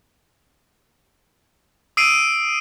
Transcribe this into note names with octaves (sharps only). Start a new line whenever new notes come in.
D#6 E6 C7 D7 D#7